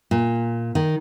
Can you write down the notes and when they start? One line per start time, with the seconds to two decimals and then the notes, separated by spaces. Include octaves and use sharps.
0.11 A#2
0.75 D#3